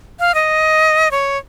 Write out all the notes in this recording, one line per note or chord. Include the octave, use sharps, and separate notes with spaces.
F5
D#5
C#5